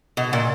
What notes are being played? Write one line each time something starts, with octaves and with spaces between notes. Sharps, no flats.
B2
A#2